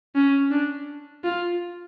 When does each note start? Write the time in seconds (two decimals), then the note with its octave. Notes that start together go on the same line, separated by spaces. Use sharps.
0.15 C#4
0.51 D4
1.24 F4